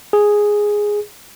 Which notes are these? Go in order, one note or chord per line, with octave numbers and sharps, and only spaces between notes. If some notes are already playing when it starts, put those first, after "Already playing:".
G#4